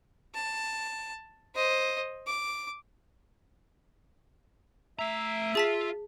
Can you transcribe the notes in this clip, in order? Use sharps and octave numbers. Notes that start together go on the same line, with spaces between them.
A5
C5 D#5
D6
A3 E5 A#5
F4 G#4 A5 B6